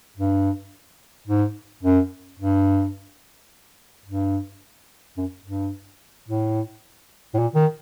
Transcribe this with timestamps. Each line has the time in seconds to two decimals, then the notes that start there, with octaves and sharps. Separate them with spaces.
0.17 G2
1.27 G#2
1.83 F#2
2.39 G2
4.05 G2
5.17 F#2
5.45 G2
6.28 A2
7.34 A2
7.38 A#2
7.55 D#3